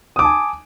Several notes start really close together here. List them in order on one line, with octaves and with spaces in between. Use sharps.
D#6 D6 A5 G#5